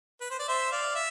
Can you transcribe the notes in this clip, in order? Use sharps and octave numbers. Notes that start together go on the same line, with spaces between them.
B4
C5
D5
C5 E5
D5 F5
E5